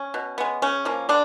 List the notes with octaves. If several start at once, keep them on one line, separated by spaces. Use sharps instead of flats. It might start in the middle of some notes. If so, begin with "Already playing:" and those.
Already playing: C#4
B2
G#3 B3
C#3 C#4
F3 A#3
D3 D4